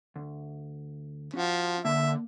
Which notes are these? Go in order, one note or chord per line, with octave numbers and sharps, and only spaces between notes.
D2
F3 C#4 F#4 F#5
D3 A#3 E5